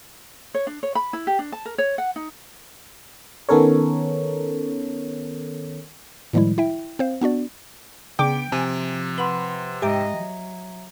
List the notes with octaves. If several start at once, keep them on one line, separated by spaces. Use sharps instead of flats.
C#5
D4
C#5
B5
E4
G4
D4
A5
A#4
C#5
F#5
D#4
D#3 B3 C#4 A4 A#4 C#5
A2 D#3 F3 G3 G#3 E4
E4 E5 G5
C4 C5 F5
B3 D4 F#4 D5
C#3 B3 D4 G5 D6 D7
C3 F3 G#5
B4 F#5 B5 C6
G#2 G4 D#5 E5 G5 A#5
F#3